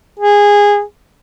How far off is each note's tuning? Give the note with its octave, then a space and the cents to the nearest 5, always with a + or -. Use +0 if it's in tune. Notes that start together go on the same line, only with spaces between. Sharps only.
G#4 -15